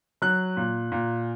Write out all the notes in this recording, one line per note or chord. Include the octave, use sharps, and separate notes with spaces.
F#3 F#6
A#2
A#2